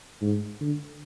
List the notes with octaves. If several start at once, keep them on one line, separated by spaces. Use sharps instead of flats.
G#2
D3